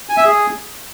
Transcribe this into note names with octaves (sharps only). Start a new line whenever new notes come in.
G#5
E5
G#4